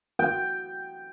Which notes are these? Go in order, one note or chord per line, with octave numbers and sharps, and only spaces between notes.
G5